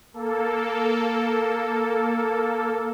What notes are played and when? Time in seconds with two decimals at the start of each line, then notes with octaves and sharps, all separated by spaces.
0.14 A#3 A4